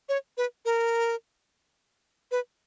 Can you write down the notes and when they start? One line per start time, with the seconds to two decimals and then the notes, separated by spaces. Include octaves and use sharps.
0.09 C#5
0.37 B4
0.65 A#4
2.31 B4